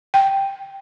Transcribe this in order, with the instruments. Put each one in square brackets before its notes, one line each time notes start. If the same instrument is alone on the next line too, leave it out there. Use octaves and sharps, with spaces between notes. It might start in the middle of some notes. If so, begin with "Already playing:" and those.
[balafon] G5